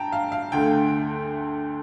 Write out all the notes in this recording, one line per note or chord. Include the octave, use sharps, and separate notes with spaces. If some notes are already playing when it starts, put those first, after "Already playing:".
Already playing: G2 G5 A5 A#5
F5
F5
D2 D3 A3 G5